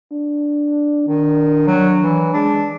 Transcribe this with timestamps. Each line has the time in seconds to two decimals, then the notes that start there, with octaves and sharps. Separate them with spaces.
0.12 D4
1.08 D#3 D4
1.67 F#3
2.03 E3
2.34 G#3 D4